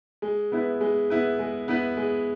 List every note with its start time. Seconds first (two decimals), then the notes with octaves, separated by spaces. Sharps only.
0.22 G#3
0.52 B3 E4 B4
0.81 G#3
1.10 B3 E4 B4
1.39 G#3
1.68 B3 E4 B4
1.97 G#3